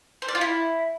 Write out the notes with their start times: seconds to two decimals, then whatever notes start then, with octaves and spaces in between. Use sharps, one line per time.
0.22 C5
0.28 D5
0.35 F4
0.41 E4